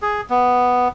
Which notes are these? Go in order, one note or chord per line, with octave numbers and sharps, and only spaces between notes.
G#4
B3